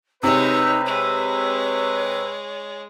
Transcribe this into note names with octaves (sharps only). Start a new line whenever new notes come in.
C3 G#3 D#4 B4 C#5
G#3 C#5